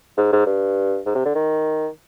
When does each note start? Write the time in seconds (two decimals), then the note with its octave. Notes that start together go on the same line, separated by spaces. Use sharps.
0.18 G#2
0.33 G#2
0.47 G2
1.06 G#2
1.15 C3
1.25 D3
1.35 D#3